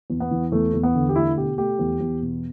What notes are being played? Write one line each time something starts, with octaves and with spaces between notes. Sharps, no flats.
E2
B3
E3
E2 A3
E2
B3
D3
G4
A3 E4
B2 G4
A3 G4
E2
E2
B2